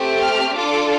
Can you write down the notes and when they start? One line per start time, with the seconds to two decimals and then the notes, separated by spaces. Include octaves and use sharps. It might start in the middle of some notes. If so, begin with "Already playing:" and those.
Already playing: A3 C4 G4
0.21 F6
0.54 D4 F4 A4 D6